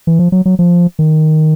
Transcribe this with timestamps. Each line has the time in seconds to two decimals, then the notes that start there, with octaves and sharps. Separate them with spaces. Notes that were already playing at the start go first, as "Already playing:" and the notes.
0.07 E3
0.19 F3
0.32 F#3
0.46 F#3
0.59 F3
0.99 D#3